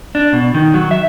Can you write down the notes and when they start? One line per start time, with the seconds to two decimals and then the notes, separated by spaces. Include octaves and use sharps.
0.15 D4
0.33 B2
0.54 D#3
0.74 F#3
0.91 E5